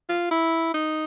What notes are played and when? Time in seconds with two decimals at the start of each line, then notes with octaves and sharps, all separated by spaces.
0.09 F4
0.31 E4
0.74 D#4